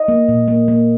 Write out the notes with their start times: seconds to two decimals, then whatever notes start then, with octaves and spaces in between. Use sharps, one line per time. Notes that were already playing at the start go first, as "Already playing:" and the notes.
Already playing: D#5
0.08 A#3
0.29 A#2
0.48 A#3
0.68 A#3